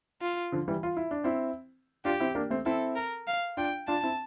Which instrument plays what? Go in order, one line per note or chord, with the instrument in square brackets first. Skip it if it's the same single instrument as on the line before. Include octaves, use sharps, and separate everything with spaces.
[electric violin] F4
[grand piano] D3 F3
E3 G3
F4
E4
D4
C4 E4
[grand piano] D4 F4 [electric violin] G4
[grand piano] C4 E4
A#3 D4
A3 C4
[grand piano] C4 E4 [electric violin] A4
[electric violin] A#4
F5
[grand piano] D4 F4 [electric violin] G5
[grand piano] D4 F4 [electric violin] A5
[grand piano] C4 E4